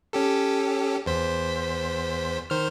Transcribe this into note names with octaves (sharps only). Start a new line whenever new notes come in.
C#4 G4 A4
E2 C5 B6
D#3 C5 F6